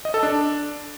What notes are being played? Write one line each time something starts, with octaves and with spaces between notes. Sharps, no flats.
D#5
A4
D4